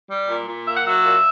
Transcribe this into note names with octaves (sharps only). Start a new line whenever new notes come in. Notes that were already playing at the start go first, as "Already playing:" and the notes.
G3
A#2
A#2
A#3 E5
F#5
F#3 E5
A#2